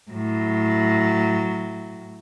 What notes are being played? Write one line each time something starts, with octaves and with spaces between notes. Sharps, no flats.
A2 F#3